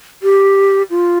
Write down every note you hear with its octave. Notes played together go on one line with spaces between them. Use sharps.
G4
F4